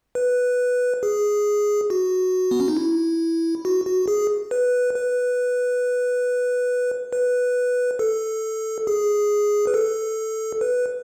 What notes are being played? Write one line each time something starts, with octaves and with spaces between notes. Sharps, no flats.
B4
G#4
F#4
B3
C#4
D#4
E4
F#4
F#4
G#4
B4
B4
B4
A4
G#4
B4
A4
B4